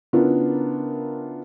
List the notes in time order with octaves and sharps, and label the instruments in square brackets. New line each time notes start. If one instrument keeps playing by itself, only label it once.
[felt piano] C#3 B3 D4 E4 F4 A#4